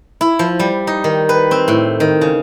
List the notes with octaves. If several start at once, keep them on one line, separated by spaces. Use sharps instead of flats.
E4
F3
G3
D#4
D#3
B4
C4
A2
D#3
C#3